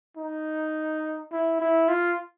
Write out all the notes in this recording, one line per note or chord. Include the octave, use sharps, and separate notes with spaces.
D#4
E4
E4
F4